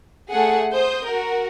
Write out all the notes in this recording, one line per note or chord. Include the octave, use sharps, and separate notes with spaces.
A3 G#4 F#5
C5 D#6 G6
F#4 A#4